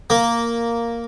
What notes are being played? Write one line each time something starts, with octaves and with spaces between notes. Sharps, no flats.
A#3